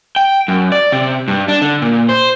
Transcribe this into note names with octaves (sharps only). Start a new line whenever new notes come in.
G5
F#2
D5
C3
G2
D4
D3
A#2
C5